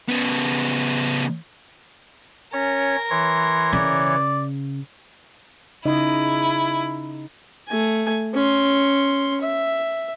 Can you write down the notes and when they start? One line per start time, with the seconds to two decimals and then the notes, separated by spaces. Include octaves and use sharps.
0.08 C#3 B3
2.53 C#4 A#4 C#5
3.10 E3 C#5 C6
3.73 C#3 D5
5.85 C#3 D#4 E4 D#5
7.68 A3 G#5
8.34 C#4 C6
9.41 E5